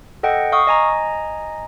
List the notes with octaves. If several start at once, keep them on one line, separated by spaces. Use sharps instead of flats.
A4 D#5 F#5 G5
F5 C#6 D#6
D#5 G#5 A#5